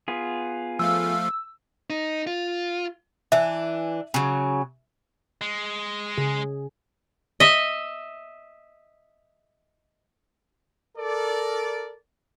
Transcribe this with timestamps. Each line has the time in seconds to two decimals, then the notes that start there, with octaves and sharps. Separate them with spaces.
0.08 B3 F4 G#4
0.79 F3 A3 F5 E6
1.90 D#4
2.27 F4
3.32 E3 D4 E5
4.14 C#3 F#3
5.41 G#3
6.18 C#3 G#4
7.40 D#5 E5
10.98 A4 A#4 D5